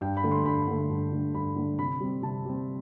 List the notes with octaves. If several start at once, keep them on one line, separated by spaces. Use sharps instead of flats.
G2 G5
B5
D3 A3
C6
G2 B5
D3 A3
G2
D3 A3
G2 B5
D3 A3
C3 B5
G3 C4
C3 A5
G3 C4